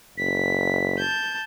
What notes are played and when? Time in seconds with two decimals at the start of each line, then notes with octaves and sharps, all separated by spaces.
0.18 F#1 B6
0.98 A5 G6